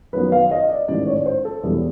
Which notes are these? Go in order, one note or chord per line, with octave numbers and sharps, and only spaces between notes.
F#2 D#3 F#3 B3 B4
F5
D#5
D5
A1 G#2 D#3 D5
C#5
C5
A4
E1 E2 B2 G3